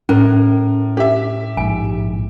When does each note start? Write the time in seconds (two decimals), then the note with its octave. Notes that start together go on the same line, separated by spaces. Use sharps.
0.09 A2 C#4 A#4
0.97 G4 E5
1.57 A#1 G#2 G#5